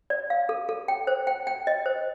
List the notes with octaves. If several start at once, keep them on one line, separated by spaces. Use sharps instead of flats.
D5
F5
A4
A4
G5
C5
G5
G5
D#5
C5